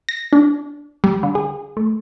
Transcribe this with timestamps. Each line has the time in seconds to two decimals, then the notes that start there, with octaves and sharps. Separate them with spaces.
0.09 A#6
0.33 D4
1.04 G3
1.23 D3
1.35 G#4
1.77 A3